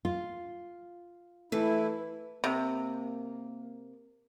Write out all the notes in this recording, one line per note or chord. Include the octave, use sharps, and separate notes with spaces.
F4
E3 A3 E4
C3 A#3